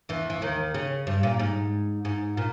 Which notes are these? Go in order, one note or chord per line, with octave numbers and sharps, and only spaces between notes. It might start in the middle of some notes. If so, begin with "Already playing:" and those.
E2 E3
E3
D#2 D#3
C#3
G2
A#2
G#2
G#2
A#2